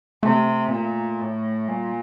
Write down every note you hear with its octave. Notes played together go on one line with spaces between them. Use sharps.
C3 A3
A#2
A2
A#2 G3